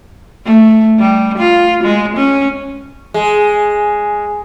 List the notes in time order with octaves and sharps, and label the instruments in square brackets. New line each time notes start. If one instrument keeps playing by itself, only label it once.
[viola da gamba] A3
G3
F4
G#3
C#4
[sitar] G#3